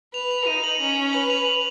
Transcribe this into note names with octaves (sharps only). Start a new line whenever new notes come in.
B4 F7
F7
D#4 D#7
F#7
C#4
B4 F#7
F7
F#7